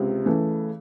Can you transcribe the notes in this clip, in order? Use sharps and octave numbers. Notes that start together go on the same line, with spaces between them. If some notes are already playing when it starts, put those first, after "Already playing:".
Already playing: C#2 C3
C#3 E3 A3